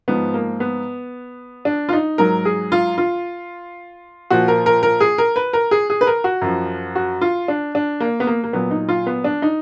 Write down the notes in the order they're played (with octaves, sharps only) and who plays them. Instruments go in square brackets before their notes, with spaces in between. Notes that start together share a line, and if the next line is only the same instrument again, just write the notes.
[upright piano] G#2 F3 B3
A#3
B3
D4
F4
D#4
G#2 F#3 A#4
G#4
F4
F4
A#2 F3 F#4
A#4
A#4
A#4
G#4
A#4
B4
A#4
G#4
G#4
B4
A#4
F#4
F#2 F3
F#4
F4
D4
D4
A#3
B3
A#3
A#3
A#2 F#3 B3
D#4
F4
B3
D4
D#4